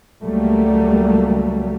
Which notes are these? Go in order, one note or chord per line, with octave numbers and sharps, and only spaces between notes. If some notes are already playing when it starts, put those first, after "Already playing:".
C#2 F#3 G3 A3 A#3